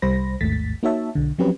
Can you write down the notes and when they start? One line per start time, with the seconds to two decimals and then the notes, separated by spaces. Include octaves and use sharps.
0.02 C2 G3 C5 B5 A#6
0.41 A1 D#2 G#2 A3 A6 B6
0.83 A#3 D#4 F#4 C#5 E5 A5
1.15 B1 D3
1.38 F3 F#3 C4 C#4 G4 B4